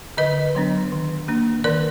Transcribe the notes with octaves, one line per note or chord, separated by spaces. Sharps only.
D3 B4 D#5
F#3 B3 D4
D#3
A#3 D4
D#3 A#4 D5